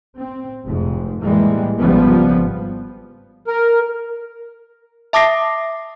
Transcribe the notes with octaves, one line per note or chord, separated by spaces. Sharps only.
C4
F1 G#2
A2 E3 G3 G#3 A#3
G#1 C#3 F3 G3 B3
A#4
E5 A5 D6 D#6 A#6 C7